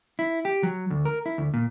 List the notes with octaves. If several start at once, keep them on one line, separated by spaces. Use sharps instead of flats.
E4
G4
F#3
D2
A#4
E4
D2
A#2